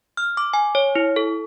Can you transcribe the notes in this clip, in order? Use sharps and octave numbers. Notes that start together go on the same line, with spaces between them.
F6
D6
G#5
C#5
E4
A4